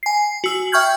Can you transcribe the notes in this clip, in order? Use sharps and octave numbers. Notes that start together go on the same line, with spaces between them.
G#5 C7
F#4 E6 F#7
E5 G5 C#6 F6 G6 G#6